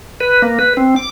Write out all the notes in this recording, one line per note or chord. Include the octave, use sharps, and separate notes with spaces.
B4
A#3
B4
C4
D6